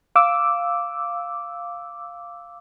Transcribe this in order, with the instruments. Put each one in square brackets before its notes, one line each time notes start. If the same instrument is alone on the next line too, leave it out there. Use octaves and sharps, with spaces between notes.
[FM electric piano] F5 D6 E6